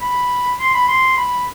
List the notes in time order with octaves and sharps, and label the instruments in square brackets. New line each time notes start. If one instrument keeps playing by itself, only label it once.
[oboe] B5
C6
B5
C6
B5